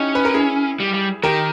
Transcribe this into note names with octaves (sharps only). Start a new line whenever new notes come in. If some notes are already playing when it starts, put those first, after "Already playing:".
Already playing: C#4 D#4 E4 G4
B4
A#4
E4 G#4
G3
G3
D#3 G4 A#4